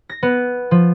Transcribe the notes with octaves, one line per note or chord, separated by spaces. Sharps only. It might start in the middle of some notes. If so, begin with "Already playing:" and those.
A#6
B3
F3